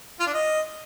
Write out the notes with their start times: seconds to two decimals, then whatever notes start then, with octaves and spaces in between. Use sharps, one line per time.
0.19 F4
0.27 D4
0.34 D#5